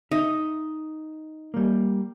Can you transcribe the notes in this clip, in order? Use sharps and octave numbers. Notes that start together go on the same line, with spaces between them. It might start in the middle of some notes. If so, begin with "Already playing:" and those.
D#4 E5
G3 A#3